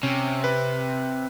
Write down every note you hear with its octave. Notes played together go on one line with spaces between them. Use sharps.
C3 C#4
B4